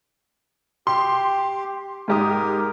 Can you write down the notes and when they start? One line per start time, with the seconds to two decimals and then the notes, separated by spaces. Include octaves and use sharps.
0.87 G4 C6
2.08 G#2 G4 A#4 D#6